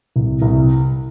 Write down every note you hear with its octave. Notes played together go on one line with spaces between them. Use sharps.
C2
C2